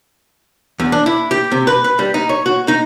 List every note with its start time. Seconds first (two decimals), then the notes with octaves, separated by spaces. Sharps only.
0.80 E2
0.92 D4
1.06 E4
1.31 G4
1.52 C3
1.67 B4
1.84 B4
1.99 G3
2.14 D#4
2.29 C#5
2.46 F#4
2.68 D#4